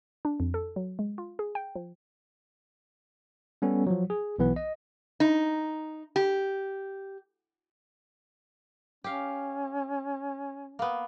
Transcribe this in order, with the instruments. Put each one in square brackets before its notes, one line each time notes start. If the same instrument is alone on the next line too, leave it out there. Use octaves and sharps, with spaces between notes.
[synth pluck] D4
F2
A4
F#3
G#3
F4
G#4
G5
F3
[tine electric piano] G3 B3 C#4 A4
F3 F#3
G#4
B1 E3 B3 B4
D#5
[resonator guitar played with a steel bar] D#4
G4
[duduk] C#4 [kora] G4 F5
[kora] A#3 B3